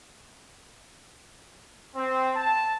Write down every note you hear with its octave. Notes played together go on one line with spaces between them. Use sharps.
C4
A5